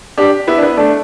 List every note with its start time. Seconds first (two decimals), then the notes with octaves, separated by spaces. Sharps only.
0.18 D4 G4
0.47 B3 E4
0.58 D4
0.63 B3
0.77 A3 D4